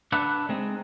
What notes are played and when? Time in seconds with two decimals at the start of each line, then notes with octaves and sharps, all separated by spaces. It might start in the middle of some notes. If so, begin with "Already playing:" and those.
0.12 D4 B4 E5 F#5
0.49 G#3 C4 D#4